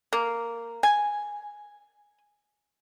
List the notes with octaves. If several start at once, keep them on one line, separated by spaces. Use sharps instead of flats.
A#3
G#5